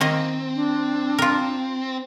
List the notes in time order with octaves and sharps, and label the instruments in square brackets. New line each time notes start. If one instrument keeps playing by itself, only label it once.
[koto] D#3 A#3 D#5 [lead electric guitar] C4
[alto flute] D4
[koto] F4 A#4